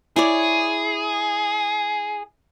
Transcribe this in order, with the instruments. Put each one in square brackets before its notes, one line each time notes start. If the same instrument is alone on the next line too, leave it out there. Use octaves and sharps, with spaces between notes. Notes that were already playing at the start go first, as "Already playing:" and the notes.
[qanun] E4 C#5 D5 [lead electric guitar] G#4